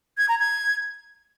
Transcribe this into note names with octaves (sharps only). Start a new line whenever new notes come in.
G#6
A#5
G#6